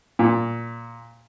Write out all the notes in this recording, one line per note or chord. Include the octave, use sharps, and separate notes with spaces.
A#2